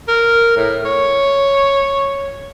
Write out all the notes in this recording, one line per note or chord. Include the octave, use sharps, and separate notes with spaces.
A#4
A2
C#5